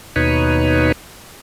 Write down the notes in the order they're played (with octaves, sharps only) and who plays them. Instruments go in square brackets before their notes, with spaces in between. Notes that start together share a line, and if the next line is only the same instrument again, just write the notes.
[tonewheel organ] D#2 B2 D#4 B4 C#5